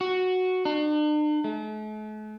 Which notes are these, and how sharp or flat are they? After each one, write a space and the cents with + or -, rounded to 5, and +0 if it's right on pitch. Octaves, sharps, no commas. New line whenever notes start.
F#4 -5
D4 +45
A3 -45